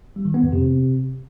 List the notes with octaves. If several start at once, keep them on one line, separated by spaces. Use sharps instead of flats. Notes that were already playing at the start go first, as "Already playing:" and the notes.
G3
D#3
B3
F2
C3